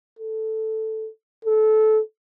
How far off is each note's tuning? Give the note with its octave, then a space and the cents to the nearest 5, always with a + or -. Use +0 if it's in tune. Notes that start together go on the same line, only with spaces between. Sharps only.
A4 +0
A4 -20